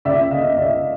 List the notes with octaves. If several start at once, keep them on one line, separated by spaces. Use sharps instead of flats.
C#2 D5 E5
C#2 D#5 F5
C#2 D5 E5